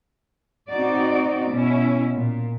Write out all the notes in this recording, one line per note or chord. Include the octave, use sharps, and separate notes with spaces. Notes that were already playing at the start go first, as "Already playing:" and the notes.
C4 D#4 F#4 D5
B2 C#4 E4
A#2